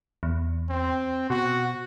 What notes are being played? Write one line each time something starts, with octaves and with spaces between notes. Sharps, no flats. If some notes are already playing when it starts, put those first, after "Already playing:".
E2
C4
B2 F#4